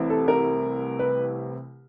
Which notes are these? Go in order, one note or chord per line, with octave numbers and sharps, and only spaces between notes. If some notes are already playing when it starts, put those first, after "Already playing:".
Already playing: C2 C3 E3 A3 C4
A4
A#4
B4